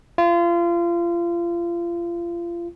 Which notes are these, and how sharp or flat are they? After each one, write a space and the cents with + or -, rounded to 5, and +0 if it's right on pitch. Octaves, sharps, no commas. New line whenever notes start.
F4 -30